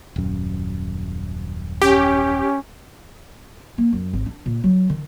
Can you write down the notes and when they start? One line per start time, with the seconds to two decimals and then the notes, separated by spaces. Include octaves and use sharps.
0.16 D#1 F#2
1.82 C#4 G4
3.78 A#3
3.92 F#2
4.13 G#1
4.26 D4
4.46 A#2
4.64 F#3
4.90 D#3